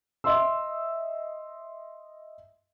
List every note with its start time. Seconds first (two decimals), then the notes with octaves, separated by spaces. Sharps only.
0.24 D#5 E5 C6 E6